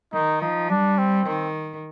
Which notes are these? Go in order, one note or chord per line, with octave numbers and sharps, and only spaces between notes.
D#3 D#4
F3 D#4
G3 D4
C4
D#3